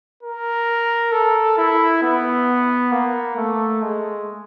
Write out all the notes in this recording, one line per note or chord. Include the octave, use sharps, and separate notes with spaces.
A#4
A4
E4
B3
A#3
A3
G#3